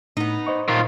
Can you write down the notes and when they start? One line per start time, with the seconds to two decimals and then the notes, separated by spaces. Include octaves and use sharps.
0.17 A2 B3 D#4
0.47 C5 D#5 C#6
0.68 A#2 D#3 F4